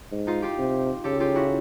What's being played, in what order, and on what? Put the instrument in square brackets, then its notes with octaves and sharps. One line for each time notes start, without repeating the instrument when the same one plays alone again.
[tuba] G#2
[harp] D#4 F4
F4 G4
[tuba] C3
[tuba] C#3 [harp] G4 A4
[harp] F4 G4
E4 F#4